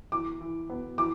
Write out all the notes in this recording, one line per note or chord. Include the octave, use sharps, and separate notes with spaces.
E3 D6
E3
B3
E3 D6